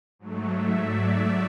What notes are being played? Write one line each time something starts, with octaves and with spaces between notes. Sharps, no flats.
G#2 F#3 A3
E5
D5
E5